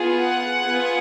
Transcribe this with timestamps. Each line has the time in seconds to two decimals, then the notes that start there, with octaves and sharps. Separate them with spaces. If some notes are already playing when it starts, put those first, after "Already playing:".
Already playing: B3 F4 G#4
0.19 F#5
0.62 B3 F4 G#4